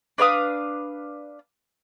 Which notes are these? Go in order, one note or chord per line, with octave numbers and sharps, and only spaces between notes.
D4 B4 F5 D#6